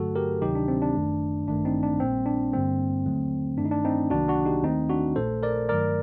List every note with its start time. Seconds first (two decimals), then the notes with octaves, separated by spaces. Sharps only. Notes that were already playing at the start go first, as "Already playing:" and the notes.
Already playing: G2 D3 F#3 A3 F#4 A4
0.15 G4 A#4
0.42 D2 C3 D#3 F#3 D#4 G4
0.55 D4
0.68 C4
0.82 D4
0.95 G1 F#2 D#3 A3
1.47 A1 G2 D#3 A3 D4
1.65 C4 D#4
1.83 D4
2.00 A#1 A#2 G3 A#3 C4
2.26 D4
2.52 G2 D3 G3 A#3 C4
3.06 D#2 D3 F#3 A3
3.58 G2 D#3 A3 D4
3.65 D#4
3.71 D4
3.85 C4 D#4
4.10 C2 C3 D#3 F#3 A#3 D4 F#4
4.28 D4 F#4
4.45 D#4 G4
4.63 D#2 D#3 A3 C4 D#4
4.90 D4 F#4
5.16 A#1 A#2 A3 A4 C5
5.43 A#4 D5
5.69 G2 D#3 F#3 A3 A#4 D5